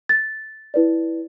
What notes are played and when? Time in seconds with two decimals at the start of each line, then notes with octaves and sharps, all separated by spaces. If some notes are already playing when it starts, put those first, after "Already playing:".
0.09 A6
0.74 E4 B4 D5